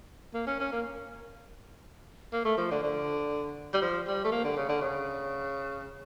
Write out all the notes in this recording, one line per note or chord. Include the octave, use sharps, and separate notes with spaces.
A#3
C#4
C#4
A#3
A#3
A3
F3
D3
D3
G3
F3
G3
A3
A#3
D3
C#3
D3
C#3